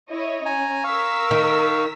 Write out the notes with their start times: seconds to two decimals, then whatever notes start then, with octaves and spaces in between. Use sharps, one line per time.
0.11 E4 C#5 D#5
0.46 C#4 G#5 A#5
0.84 A#4 F5 C#6 E6 B6
1.31 D#3